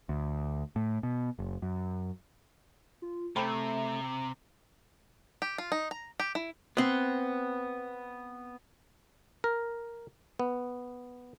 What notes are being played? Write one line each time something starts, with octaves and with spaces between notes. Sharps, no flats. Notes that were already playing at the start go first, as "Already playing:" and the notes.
D2
A2
B2
F#1
F#2
F4
C3 A3 C5 G5 A#5 B5
G4
F4
D#4
A#5
G4
E4
B3 C4
A#4
B3